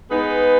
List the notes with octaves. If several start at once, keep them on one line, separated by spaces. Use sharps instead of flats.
G#3 B3 D#4 G#4 B4